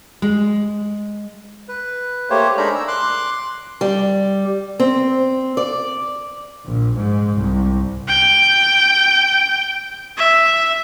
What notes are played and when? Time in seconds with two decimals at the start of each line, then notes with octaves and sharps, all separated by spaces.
0.22 G#3
1.69 B4
2.30 A3 A#3 G4 C5 C#5
2.57 G#3 D4 D#4 A#4 A#5 B5
2.76 E6
2.88 C6 D6 F#6
3.81 G3
4.80 C4
5.57 D5
6.65 A#1
6.96 G#2
7.38 C2
8.09 G5
10.17 E5